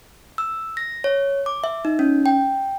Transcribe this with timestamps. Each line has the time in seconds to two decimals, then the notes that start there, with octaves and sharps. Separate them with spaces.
0.38 E6
0.77 A#6
1.04 C#5
1.46 D6
1.64 E5
1.85 D#4
1.99 C#4
2.26 G5